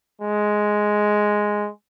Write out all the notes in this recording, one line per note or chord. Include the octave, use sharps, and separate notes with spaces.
G#3